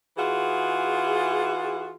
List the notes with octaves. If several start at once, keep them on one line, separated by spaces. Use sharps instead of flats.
E3 F4 F#4 G#4